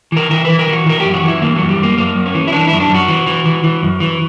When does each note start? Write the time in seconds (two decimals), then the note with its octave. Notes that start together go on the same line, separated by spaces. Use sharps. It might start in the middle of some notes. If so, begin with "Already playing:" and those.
0.12 E3 A#4
0.31 E3 A#4
0.45 B4
0.50 E3
0.59 A#4
0.68 E3 F#4
0.86 E3 A#4
1.00 F#2 G4
1.14 F#4
1.24 E3 E4
1.42 E3 A#3
1.56 F#2 F#3
1.69 G3
1.79 F#2 A#3
1.97 F#2 A#3
2.15 F#2
2.26 C#4
2.34 E3
2.48 E4
2.52 E3 D4
2.67 F#2 E4
2.80 D4
2.90 F#2 F#4
3.08 E3
3.27 E3
3.46 E3
3.64 E3
3.83 F#2
4.00 E3